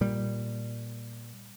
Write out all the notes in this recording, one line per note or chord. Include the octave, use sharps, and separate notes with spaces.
A#2 G3